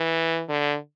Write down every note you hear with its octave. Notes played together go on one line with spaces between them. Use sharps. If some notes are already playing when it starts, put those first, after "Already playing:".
Already playing: E3
D3